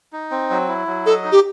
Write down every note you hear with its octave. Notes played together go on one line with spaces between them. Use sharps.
D#4
C4
F#3
E4
F#3
A4 D#5
D#4
G4